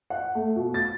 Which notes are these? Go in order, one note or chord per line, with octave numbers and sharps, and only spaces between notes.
F#5
A3
B2
A6